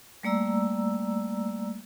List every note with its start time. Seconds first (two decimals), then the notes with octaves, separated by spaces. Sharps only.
0.23 G3 A3 A#3 D5 A#5 E6